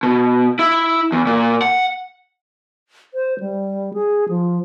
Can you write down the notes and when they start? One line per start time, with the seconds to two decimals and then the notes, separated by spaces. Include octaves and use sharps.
0.03 B2
0.59 E4
1.12 E2
1.27 A#2
1.62 F#5
3.14 C5
3.40 G3
3.94 G#4
4.29 F3